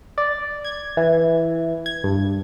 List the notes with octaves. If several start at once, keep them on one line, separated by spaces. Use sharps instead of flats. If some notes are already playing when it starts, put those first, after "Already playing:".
D5
G#6
E3
G#6
G2